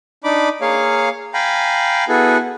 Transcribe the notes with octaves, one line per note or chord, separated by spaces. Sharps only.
D4 D#4 B5 D6
A#3 G#4 C#5 F5
F5 G5 G#5 A#5 B5
B3 E4 F#4 G#4 A4